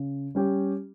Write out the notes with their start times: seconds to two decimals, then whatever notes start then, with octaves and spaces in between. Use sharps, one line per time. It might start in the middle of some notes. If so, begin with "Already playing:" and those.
Already playing: C#3
0.35 G3 C#4 G4